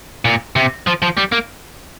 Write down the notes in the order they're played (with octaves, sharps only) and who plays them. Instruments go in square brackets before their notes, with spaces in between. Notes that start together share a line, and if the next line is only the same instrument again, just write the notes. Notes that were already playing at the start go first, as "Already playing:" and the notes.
[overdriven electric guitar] A#2
C3
F3
F3
G3
A#3